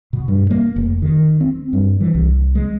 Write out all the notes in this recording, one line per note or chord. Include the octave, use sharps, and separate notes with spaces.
B2
G2
A#3
F1
D#3
C4
G2
E3
C2
G#3